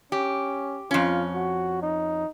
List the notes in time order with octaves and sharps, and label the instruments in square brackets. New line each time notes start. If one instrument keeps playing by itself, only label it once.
[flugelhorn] C#4 [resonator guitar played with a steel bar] G4
[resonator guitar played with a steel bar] F2 C#4 [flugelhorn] F4
[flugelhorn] F#4
D#4